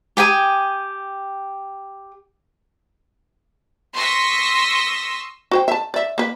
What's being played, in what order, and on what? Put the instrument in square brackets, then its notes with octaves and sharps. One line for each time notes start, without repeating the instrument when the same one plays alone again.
[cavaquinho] G4 G5 G#5 D#6
[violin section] C6 C#6 D#6 E6 A#6 B6
[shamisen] F#4 C5 G5
E5 A5
D5 E5
A#3 B4